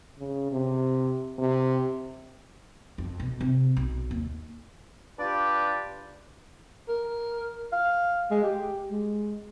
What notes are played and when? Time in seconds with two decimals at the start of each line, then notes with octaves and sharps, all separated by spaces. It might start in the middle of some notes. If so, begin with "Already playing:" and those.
0.18 C#3
0.52 C3
1.39 C3
2.98 F2
3.20 B2
3.41 C3
3.77 B1
4.11 D#2
5.19 D4 F4 G4 B4 D5
6.89 A#4
7.73 F5
8.31 G#3
8.43 G4
8.91 G#3